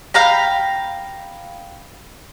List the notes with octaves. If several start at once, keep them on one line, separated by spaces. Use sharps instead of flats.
F5 G5 A#5 B5